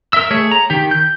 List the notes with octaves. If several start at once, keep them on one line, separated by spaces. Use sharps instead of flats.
A#4 D#5 E5 E6
A3 G#4 C#5
A#5
D#3 G4
G6